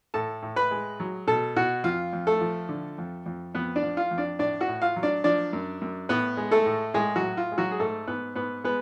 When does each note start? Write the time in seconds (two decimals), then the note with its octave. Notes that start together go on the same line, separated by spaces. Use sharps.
0.14 A2 A4 A5
0.42 A2
0.56 B4 B5
0.71 G#3
1.00 F#3
1.27 B2 A4 A5
1.56 B2 F#4 F#5
1.84 F2 F4 F5
2.13 F2
2.27 A3 A4
2.41 F3
2.69 D3
2.98 F2
3.26 F2
3.55 F2 B3 B4
3.76 D4 D5
3.83 F3
3.97 F4 F5
4.11 F2
4.18 D4 D5
4.39 A2 D4 D5
4.61 F#4 F#5
4.68 A2
4.82 F4 F5
4.96 F#3
5.03 D4 D5
5.24 F3 D4 D5
5.53 F#2
5.82 F#2
6.09 A2 B3 B4
6.37 G#3
6.51 A3 A4
6.66 A2
6.94 A2 G#3 G#4
7.16 F#3 F#4
7.23 A2
7.37 F4
7.52 G#3
7.58 F#3 F#4
7.71 G#4
7.80 G#2 A3 A4
8.08 G#2 B3 B4
8.36 G#2 B3 B4
8.64 G#3 B3 B4